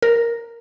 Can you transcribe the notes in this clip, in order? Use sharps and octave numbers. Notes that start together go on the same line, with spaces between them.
A#4